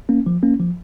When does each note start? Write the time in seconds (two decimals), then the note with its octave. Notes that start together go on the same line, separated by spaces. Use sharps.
0.09 A#3 C#4
0.26 F3
0.43 A#3 C#4
0.60 F3